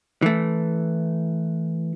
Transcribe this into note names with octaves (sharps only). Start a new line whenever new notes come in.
E3 A3